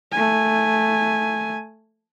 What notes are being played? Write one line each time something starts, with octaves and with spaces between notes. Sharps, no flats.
A3 G#5